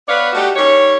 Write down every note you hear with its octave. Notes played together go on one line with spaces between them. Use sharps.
B3 B4 C#5 D5 F5
A3 D4 D#4 F#4 G4
D#3 G3 C#5